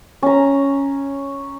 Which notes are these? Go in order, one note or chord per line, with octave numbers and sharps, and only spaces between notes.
C#4 A#5